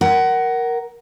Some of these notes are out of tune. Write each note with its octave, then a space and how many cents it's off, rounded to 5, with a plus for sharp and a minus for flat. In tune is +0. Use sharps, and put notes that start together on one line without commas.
A#4 +5 F#5 +20